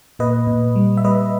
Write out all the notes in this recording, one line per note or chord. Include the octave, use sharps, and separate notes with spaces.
A#2 B4 D#5
A#2
G3
E5
G3 B4 D#5